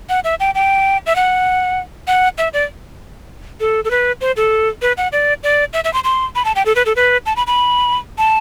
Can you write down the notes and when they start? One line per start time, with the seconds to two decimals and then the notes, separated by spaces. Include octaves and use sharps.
0.09 F#5
0.24 E5
0.40 G5
0.55 G5
1.06 E5
1.16 F#5
2.07 F#5
2.38 E5
2.53 D5
3.60 A4
3.85 A4
3.91 B4
4.21 C5
4.37 A4
4.82 B4
4.97 F#5
5.12 D5
5.43 D5
5.73 E5
5.84 E5
5.94 C6
6.04 C6
6.35 B5
6.45 A5
6.55 G5
6.66 A4
6.76 B4
6.86 A4
6.96 B4
7.26 A5
7.36 B5
7.47 B5
8.18 A5